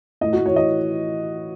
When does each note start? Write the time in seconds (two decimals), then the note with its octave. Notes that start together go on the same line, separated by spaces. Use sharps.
0.21 A2 D#5
0.33 A2 F#4
0.46 C#5
0.53 E3 D#5